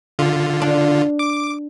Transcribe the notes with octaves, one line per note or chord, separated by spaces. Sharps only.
D3 F4
D4
D6